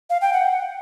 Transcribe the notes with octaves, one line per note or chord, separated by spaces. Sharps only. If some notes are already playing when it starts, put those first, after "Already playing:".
F5
G5
F#5